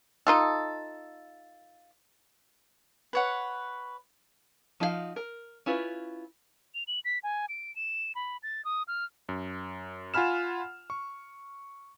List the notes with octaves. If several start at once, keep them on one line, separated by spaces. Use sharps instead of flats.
D#4 F4 A4
B4 C#5 F#5
F3 D#4 F#4 G#4 F5
A#4
C#4 E4 F4 B4
F7
F#7
B6
G#5
D7
E7
B5
A6
D#6
F6
F#2
F4 F#5 G#5 B5 F6 E7
C#6